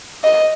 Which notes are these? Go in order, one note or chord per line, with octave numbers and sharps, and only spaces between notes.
D#5